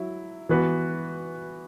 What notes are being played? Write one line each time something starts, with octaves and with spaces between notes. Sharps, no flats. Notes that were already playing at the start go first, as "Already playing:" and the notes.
Already playing: F#3 E4
E3 B3 F#4 B4